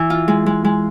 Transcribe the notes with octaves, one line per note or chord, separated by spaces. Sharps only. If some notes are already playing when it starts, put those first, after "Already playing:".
Already playing: E3
F4
G#3
G#3
G#3